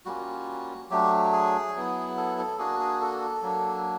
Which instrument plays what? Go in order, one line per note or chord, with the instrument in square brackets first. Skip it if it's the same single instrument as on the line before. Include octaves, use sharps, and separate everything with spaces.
[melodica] G3 A#3 C#4 F4 F#4
F#3 A3 D4 G4
G#4
F#3 B3 E4
A4
A4
A#3 D4 F#4 G#4
G#4
A4
F#3 A#3 D4